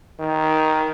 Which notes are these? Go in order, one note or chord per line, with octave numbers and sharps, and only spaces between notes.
D#3